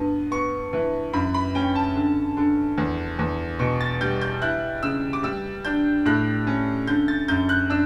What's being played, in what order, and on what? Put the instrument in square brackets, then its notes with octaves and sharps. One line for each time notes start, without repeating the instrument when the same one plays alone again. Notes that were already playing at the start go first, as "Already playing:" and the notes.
Already playing: [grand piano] G2 B3
B3 C#6
E3
F#2 B5
B5
C#4 G5
A5
D3
D3
E2
E2
B2 C#6
A6
G3 G6
G6
E4 F#6
C#3 E6
D6
G3 E6
D4 G6
A2 F#6
C#4
D3 G6
A6
F#2 G6
F#6
D4 E6